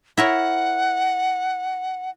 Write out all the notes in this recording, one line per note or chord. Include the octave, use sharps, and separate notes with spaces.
E4 A#4 C#5 F#5